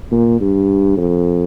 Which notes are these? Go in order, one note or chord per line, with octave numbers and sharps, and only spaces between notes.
A#2
G2
F2